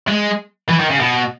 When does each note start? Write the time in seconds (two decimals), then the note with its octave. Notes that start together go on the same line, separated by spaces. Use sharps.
0.08 G#3
0.69 E3
0.79 D#3
0.90 C#3
1.00 B2